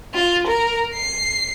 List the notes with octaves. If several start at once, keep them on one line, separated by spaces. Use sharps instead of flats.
F4
A#4
C7